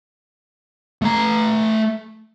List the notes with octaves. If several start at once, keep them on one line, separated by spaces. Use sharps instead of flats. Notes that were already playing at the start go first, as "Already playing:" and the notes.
A3 A#5